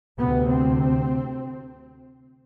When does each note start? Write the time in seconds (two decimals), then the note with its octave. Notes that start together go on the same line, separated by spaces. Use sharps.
0.19 D2 C3 B3
0.51 C4